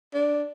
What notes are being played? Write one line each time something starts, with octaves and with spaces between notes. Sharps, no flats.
D4